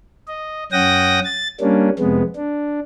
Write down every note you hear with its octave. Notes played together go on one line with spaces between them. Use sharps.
D#5
F#2 C#4 F#5 G5 D#6 A#6
A6
G3 A#3 C#4 D4
F2 C3 G#3 B3
D4